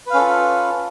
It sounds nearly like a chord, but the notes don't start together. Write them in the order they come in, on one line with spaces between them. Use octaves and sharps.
B4 F5 C#4 A4 F4